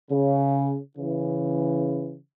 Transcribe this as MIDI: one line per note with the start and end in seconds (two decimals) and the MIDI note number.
0.11 0.78 49
0.97 2.17 49
0.97 2.17 52